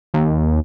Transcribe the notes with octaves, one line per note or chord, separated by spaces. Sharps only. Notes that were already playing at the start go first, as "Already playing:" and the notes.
D#2